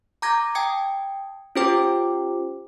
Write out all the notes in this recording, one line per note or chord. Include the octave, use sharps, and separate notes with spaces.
A#5 D6 G6 G#6 A#6
G5 A5 D#6 G#6 C#7
C#4 F4 G4 C5 G5 D6